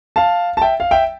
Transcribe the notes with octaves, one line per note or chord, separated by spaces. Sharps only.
F5 A5
A5
E5 G5
F5
E5 G5